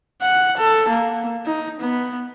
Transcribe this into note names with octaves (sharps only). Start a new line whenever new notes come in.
F#5
A4
A#3
D#4
B3